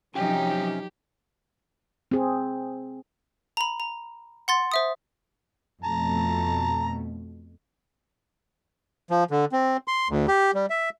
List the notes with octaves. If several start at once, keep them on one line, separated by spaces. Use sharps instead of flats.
C3 F3 F#3 C#4 D#4 F4 G4 G5
C4 G#4
A#5 B5
A#5
F#5 C6 A6
C5 E5 D#6
F2 B2 A3 A5 A#5
F3
D3
C4
C6
D2
G4
G3
E5